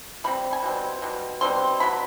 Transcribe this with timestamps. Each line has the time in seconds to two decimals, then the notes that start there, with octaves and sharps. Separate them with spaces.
0.24 B2 G3 C4 B5
0.53 G#5
0.63 B2 G3 C4
1.02 B2 G3
1.41 B2 G3 C4 C6
1.80 F#3 B3 D4 B5